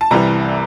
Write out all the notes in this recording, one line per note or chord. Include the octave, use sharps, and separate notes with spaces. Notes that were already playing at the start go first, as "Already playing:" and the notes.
A5
C2 C3 E3 G3 A#5